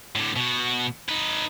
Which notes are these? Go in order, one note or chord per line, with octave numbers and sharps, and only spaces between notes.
A2 D3
B2 F#4
D#4 B4